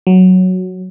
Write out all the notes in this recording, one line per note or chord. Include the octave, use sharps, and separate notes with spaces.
F#3